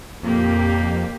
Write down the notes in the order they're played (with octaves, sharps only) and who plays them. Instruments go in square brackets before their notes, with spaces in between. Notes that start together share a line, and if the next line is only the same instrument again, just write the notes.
[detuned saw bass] F2 [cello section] A#2 A#3 G4